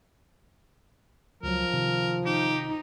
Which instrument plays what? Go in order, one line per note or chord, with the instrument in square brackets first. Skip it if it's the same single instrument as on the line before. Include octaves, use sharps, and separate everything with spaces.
[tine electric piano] C#2 F#3 [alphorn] F3 [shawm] A#4
[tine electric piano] C3 D#3
[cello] D#4 [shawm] G4